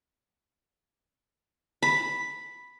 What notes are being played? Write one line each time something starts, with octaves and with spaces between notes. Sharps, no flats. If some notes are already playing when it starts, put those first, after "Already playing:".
B5